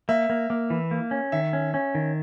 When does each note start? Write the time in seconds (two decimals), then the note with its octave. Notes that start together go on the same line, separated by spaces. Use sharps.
0.09 A#3 E5
0.30 A#3
0.50 A#3
0.70 E3
0.91 A#3
1.11 C#4
1.32 D#3 E5
1.53 C#4
1.74 C#4
1.95 D#3